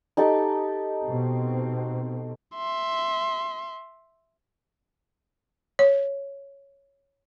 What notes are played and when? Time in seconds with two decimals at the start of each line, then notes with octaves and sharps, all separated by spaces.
0.17 D#4 G4 A4
1.04 B2 C4
2.55 E5 C6
5.79 C#5